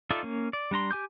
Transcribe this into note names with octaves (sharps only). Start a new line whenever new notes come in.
D#4 F4 A4 D5 E5
A#3 C#4
D5
G3 D4 A#5 C6
G4 G#5 D6 G6